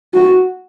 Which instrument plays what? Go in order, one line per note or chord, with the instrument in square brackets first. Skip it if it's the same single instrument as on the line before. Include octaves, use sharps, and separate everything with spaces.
[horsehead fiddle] F#4